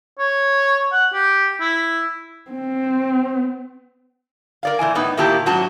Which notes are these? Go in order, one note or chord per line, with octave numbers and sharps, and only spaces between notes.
C#5
F#5
G4
E4
C4
A#4 D5 F5
A#2 E3 E4 G#5
A2 B3 D#4
A#2 D#3 A#3 E4 G4 A5
G#2 F#3 C#4 F#4 A5